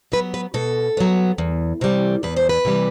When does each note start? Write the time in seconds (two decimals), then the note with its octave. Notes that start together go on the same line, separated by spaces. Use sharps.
0.12 F#3 B3 B4
0.34 B4
0.54 B2 A4
0.97 F#3 B3
1.38 E2
1.81 C3 E3 G3
2.23 E2 B4
2.36 C5
2.49 B4
2.65 C3 E3 G3